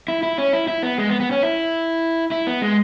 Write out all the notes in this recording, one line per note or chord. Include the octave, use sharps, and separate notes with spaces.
E4
E4
C#4
E4
E4
B3
G#3
B3
B3
C#4
E4
E4
B3
G#3